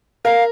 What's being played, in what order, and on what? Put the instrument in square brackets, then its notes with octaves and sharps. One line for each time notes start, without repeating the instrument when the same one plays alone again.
[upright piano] A#4 [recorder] F5